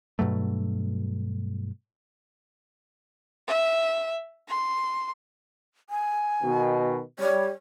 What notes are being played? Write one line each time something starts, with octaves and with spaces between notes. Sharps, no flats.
G2 B2 F#3 A3
E5
C6
G#5
B2 D#3
G3 C#5